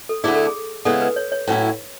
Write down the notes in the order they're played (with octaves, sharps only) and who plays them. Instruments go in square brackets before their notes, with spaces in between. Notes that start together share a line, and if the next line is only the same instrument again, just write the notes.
[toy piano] A4
[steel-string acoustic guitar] D2 D3 A3 E4 [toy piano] G#4
[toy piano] A4
G#4
[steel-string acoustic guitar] C#3 G#3 B3 E4 [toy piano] A4
[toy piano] B4
C#5
C#5
[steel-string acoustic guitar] A2 F#3 C#4 E4